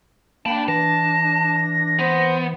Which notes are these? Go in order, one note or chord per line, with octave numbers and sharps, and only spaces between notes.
A#3 D4 D5 G5 A5 B5
E3 A5 A#6
B3 C5